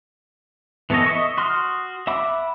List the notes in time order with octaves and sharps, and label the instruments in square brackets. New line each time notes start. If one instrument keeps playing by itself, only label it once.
[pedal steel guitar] E3 B3 A4 C#5 D#5
D#5 E5 C#6
F#4 C6 D#6 F6
E5 F#5 B5 D6